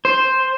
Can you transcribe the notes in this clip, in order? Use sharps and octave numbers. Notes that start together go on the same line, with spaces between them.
C5